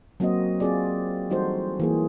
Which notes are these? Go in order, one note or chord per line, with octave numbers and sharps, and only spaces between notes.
F#3 A#3 C4 F#4 C5 D#5
C4 F4 G#4 D5
E3 G3 D#4 F#4 A4 C5
E3 A#3 G#4